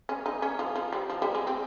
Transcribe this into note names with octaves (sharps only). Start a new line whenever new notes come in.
C#4
D#4
C#4
F3
F3
G3
F3
G3
G#3
C4